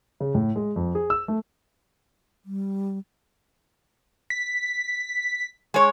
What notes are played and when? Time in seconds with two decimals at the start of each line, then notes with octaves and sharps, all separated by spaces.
0.20 C#3
0.35 A2
0.56 G#3
0.76 F2
0.95 G#4
1.10 E6
1.28 A3
2.45 G3
4.30 B6
5.74 G#3 C#5